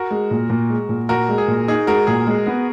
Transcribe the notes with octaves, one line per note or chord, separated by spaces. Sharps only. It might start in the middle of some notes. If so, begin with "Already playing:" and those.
Already playing: F#4 A#4
G#3
A#2
A#2
G#3
A#2
A#2 F#4 A#4
G#3
G#4
A#2
D#4 G#4
G#3 F#4 A#4
A#2 G#4
G#3
B3